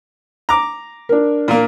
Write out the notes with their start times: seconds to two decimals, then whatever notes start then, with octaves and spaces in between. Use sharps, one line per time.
0.49 A#5 D6
1.09 D4 A#4
1.48 A#2 A#3